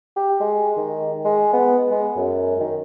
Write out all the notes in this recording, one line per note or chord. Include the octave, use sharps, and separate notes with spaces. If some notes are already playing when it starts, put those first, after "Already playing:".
G4
G#3
D#3
G#3
B3
G#3
F#2
D#3